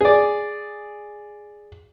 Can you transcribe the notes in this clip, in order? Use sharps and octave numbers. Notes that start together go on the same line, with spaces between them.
G#4 D5